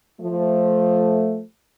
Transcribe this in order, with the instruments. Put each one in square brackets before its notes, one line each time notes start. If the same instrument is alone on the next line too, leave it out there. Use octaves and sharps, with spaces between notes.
[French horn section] F3 A3